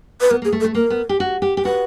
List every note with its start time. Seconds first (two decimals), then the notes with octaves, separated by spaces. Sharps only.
0.21 B4
0.31 B3 A#4
0.42 A#3
0.45 G#4
0.53 A3
0.60 A4
0.65 A3
0.75 A#3 A#4
0.90 B3
1.09 G4
1.20 F#4
1.42 G4
1.57 G4
1.65 F#4 B4